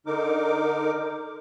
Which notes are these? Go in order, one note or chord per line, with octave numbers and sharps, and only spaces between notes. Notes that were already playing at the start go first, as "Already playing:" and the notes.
D3 D#4 A#4 D6